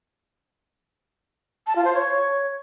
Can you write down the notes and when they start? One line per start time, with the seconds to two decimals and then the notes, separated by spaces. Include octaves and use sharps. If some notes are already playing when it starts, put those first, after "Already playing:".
1.67 A5
1.76 F4
1.84 C5
1.93 C#5